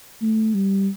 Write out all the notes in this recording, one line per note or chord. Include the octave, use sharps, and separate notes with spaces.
A3
G3